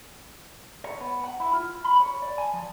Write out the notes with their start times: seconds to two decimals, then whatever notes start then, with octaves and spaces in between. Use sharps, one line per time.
0.84 C#5
1.01 B3
1.24 F#5
1.40 E4
1.53 F4
1.85 B5
2.00 C#5
2.22 D5
2.38 G#5
2.54 F3